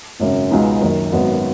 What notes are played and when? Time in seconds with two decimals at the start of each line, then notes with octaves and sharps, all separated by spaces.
0.20 G#1 F#2 C#3 F#3
0.51 C#2 B2 G#3 B3 D#4
0.81 F#1 F#2 D#3
1.12 G#1 F#2 D#3 F#3 B3